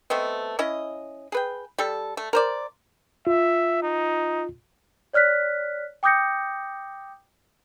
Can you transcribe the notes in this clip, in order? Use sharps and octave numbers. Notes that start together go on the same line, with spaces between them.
A3 B3 C4 D#5
C#4 E4 D#5
G#4 B4 G5
G3 A4
A3
A#4 C5 D5
F4 E5
D#4
C#5 D5 F6 F#6 B6
G5 D6 D#6 G6 A#6 C#7